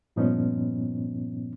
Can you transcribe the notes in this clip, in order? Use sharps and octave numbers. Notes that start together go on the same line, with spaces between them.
G2 A#2 F3 B3 C#4 D#4